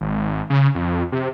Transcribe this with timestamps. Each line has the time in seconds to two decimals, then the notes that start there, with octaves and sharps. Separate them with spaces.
0.01 G#1
0.50 C#3
0.75 F2
1.12 C3